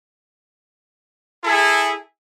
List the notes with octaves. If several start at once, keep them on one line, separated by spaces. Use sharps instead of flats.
E4 G#4 A4